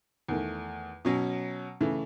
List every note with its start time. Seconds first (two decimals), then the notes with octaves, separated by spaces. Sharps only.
0.28 E2 D#3 A3
1.05 B2 F#3 C#4
1.81 C#3 E3 A3